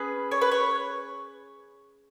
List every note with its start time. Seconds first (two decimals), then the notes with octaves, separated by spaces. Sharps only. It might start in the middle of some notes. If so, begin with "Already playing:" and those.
Already playing: C#4 G#4 B4
0.31 C#5
0.41 B4
0.52 C#5